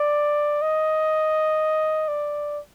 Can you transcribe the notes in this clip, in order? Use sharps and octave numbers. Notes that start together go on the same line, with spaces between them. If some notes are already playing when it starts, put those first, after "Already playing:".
Already playing: D5
D#5
D5